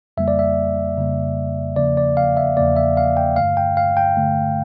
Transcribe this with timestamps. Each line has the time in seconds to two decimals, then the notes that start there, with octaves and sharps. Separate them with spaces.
0.17 F2 C#3 G3 A#3 E5
0.28 D5
0.39 E5
0.97 F2 C#3 G3 A#3
1.76 E2 C#3 F3 A#3 D5
1.97 D5
2.17 F5
2.37 E5
2.57 E2 C#3 F3 A#3 D5
2.76 E5
2.97 F5
3.17 G5
3.36 G2 D3 A3 F5
3.57 G5
3.77 F5
3.97 G5
4.17 G2 D3 A3